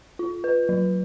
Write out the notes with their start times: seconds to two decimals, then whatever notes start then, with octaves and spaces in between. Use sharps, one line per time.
0.19 F4
0.44 B4
0.69 F#3